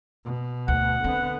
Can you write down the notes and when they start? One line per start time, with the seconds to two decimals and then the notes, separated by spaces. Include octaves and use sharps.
0.25 B2
0.68 D2 F#5
1.04 D3 B3 C4